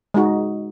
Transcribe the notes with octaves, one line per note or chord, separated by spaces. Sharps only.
G#3 D#4 F#4